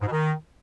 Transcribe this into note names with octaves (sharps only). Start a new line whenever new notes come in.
G#2
B2
D#3